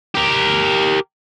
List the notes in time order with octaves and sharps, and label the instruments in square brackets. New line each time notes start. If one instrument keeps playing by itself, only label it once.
[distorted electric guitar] G4 A#4